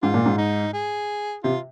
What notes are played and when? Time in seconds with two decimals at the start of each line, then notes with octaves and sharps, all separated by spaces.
0.03 G#2 F4
0.14 A#2
0.26 G#2
0.38 D#4
0.74 G#4
1.43 C3 F4